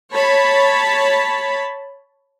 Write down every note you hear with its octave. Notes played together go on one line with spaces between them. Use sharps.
C#5 A5 B5